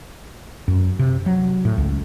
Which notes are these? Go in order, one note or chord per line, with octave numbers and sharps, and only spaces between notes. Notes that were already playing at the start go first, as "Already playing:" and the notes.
F#2
C3
F#3
A2
C#2